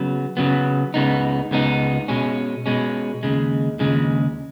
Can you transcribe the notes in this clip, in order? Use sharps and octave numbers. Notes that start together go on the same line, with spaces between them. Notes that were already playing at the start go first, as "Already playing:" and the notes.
Already playing: C#3 F#3 B3
C#3 F#3 B3
C#2 C#3 B3 D#4
C#2 C#3 B3 D#4
B2 G#3 C#4
B2 G#3 C#4
D#2 C#3 G#3
D#2 C#3 G#3